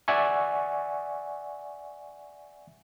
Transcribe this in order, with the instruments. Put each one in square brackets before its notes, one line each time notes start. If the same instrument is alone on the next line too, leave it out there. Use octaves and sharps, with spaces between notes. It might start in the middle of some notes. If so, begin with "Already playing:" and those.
[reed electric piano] D5 E5 F#5 G#5 C#6